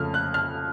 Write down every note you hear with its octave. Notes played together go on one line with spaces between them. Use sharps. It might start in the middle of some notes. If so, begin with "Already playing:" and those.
Already playing: F2 C#3 A3 F6
F#6
F6